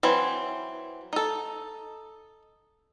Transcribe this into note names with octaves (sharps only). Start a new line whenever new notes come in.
E3 F#3 C4
D#4 A4